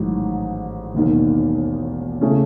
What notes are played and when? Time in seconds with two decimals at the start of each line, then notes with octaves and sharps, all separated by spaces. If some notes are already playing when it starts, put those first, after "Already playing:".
Already playing: A1 G#2 D#3 F#3
0.94 E1 D#2 D#3
2.21 C#3 E3 A3 C#4